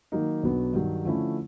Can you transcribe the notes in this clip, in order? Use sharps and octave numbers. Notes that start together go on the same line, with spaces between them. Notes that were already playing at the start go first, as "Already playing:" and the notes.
D#3 F#3 A#3 D#4
B1 B2 F#3 B3 D4
G2 D#3 F#3
D3 F3 A3 C#4 E4